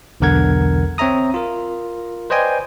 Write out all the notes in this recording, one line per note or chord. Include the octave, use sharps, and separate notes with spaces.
B1 E2 D3 A#4 F#5 G#6
C4 C#5 E5 A#5 D#6
F4 A#4
B4 C5 D5 D#5 G5 G#5